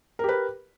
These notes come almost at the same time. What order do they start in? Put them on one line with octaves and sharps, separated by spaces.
A#4 G4 B4